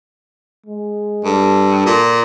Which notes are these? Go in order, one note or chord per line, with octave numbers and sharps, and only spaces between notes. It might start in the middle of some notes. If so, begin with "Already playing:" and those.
G#3
G2 A4
A#2